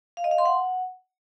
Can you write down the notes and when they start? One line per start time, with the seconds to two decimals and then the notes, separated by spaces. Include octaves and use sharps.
0.17 F5
0.24 D#5
0.31 F5
0.38 C6
0.45 F#5